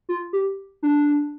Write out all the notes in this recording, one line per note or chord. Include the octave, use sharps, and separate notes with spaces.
F4
G4
D4